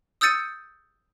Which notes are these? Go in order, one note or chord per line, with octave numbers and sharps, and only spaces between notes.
D#6 E6 G6 A6 C#7 D#7